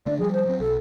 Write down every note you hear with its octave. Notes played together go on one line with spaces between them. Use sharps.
D3 A3 D4 D5
F3 G3 G#4
C5
F#3 C4
B1 A4